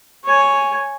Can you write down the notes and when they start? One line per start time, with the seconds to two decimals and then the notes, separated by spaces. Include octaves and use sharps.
0.24 C#5 G#5